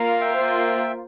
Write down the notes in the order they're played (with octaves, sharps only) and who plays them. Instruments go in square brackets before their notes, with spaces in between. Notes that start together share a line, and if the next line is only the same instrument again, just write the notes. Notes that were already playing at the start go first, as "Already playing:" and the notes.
Already playing: [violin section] A#3 F4 A#4 F5
[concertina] E5 G5
[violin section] A#3 F4 C5